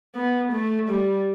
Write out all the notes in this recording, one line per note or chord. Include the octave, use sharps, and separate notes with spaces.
B3
A3
G3